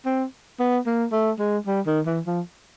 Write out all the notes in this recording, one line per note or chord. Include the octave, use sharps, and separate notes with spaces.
C4
B3
A#3
A3
G#3
G3
D#3
E3
F3